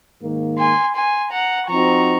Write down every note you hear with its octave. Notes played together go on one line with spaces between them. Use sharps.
G#2 D#3 A#3
G#5 C6
G#5 C6
F#5 A#5
F3 C4 D#4 F#4 A#5 C#6